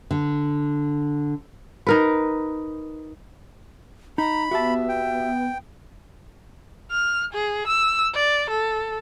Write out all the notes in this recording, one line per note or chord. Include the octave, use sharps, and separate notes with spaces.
D3
D#4 A#4 B4
D#4 A#5 B5
B3 F#4 G4 E5 A5
G5
F6
G#4
E6
D5
A4